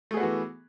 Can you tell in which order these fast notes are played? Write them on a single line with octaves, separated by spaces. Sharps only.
A3 G#4 B3 F#4 E3